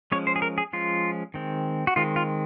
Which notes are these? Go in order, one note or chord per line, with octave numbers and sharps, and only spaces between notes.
F3 G#3 C#4 C#5
C5
G#4
A#4
G#4
F3 G#3 C#4 F4
D#3 G#3 C4
F#4
D#3 G#3 C4 F4
F4